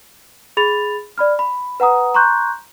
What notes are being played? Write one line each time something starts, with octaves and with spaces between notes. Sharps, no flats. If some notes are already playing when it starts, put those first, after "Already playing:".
G#4 B5 A6 F7
D5 B5 F6
B5
B4 F#5 A#5 D#6
A#5 C6 C#6 F#6 G6